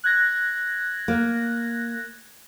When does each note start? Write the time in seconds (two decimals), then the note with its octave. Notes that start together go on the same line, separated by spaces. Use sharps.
0.04 F#6 G#6 A#6
1.08 A#3